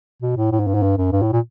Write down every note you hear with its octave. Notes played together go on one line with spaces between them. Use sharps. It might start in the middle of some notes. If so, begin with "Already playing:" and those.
B2
A2
A2
G#2
G2
G#2
G2
F#2
G2
A2
A#2